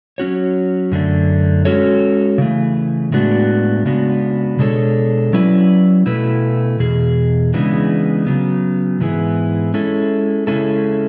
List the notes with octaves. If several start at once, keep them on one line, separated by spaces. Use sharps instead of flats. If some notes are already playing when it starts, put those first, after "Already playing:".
F#3 C#4 F#4 C#5
F#2 D3 A3 D4
G#3 C#4 F#4 A4 C#5
C#3 E3 A3
A2 G#3 B3 D4 F#4
C#3 G#3 B3 D4 F#4
B2 G#3 D4 A4 C#5
F#3 C#4 E4 B4 D5
B2 A3 E4 B4
E2 B2 G#4
C#3 E3 G#3 B3 D4
C#3 F#3 B3
G#2 E3 B3 E4 G#4
G#3 C#4 E4 A4
C#3 G#3 C#4 E4 A4